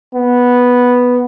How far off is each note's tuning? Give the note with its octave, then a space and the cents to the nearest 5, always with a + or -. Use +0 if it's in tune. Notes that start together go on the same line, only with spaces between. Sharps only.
B3 -5